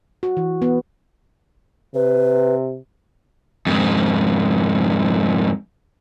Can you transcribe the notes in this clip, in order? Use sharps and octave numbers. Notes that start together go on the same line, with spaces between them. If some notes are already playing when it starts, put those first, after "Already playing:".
F#4
E3
B3
C3 B4
F2 G#2